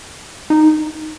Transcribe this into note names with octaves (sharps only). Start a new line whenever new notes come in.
D#4